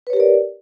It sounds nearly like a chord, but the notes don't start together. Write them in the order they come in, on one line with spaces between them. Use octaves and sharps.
B4 C#5 G4 A#4 D5